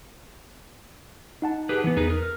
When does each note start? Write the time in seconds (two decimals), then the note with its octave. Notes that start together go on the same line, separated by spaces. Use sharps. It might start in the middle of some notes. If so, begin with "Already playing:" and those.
1.42 D#4 F#5 A5
1.69 G4 G#4 B4
1.84 E3 B3 B4
1.97 E2 D#4 G#4 B4
2.10 A#4
2.22 F6